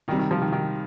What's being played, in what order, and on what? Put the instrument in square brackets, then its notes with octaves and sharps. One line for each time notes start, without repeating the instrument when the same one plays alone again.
[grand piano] C3 G3 D#4 [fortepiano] D#3
[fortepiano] D#3
F3
D#3
D#3